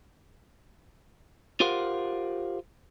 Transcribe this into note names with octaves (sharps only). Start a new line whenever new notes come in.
F4 G4 A#4 C5 F5 F#5